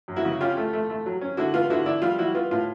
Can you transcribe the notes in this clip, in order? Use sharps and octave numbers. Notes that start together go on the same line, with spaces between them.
F#2
E4 F#4
C#3
C#4 F4 G4
A3
A3
A3
F#3
C#4
D3 E4 F#4
B3 F4
D3 E4 F#4
D4 E4
G3 F4
G3 E4 F#4
B3 F4
A2 F4